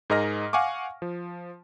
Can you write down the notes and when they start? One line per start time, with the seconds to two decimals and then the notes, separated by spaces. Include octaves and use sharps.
0.10 G#2 G#4 A#4 D#5 F6 A#6
0.53 F5 F#5 G#5 C#6 D6
1.02 F3